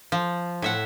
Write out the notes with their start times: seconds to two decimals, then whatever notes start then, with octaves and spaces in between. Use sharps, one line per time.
0.12 F3
0.62 A2 E5 F#5